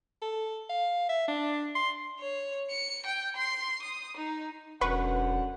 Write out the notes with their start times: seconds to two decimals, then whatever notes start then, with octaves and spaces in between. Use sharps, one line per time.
0.22 A4
0.70 F5
1.09 E5
1.28 D4
1.75 C6
2.20 C#5
2.70 C#7
3.06 G5
3.36 C6
3.82 D#6
4.17 D#4
4.81 E1 F#2 D3 B4 F#5 C#6